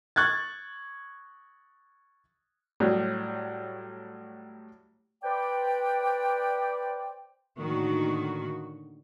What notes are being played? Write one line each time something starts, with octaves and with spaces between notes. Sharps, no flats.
C#6 F#6 G#6 A6
A2 F#3 G3
B4 C5 D5 G5
A2 D3 D#3 A#3 F#4